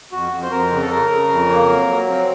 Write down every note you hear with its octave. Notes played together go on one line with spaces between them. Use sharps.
F2 F#4
F2
C5
F2 A#4
C#3
A4
C#3 A#4
C#3
F2
A#3
F#3
F#3
C4